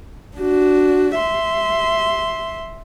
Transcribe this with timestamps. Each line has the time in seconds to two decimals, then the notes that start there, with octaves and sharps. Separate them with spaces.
0.38 D4 F#4
1.18 E5 C6